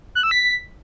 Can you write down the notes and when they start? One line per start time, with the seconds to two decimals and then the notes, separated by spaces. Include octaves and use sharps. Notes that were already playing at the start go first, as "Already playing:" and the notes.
0.15 F#6
0.23 E6
0.31 B6